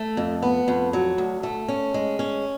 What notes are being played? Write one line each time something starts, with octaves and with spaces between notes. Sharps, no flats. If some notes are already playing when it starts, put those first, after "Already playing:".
Already playing: A3
F2
B3
F2
F#3
D2
A3
C#4
G#3
C#4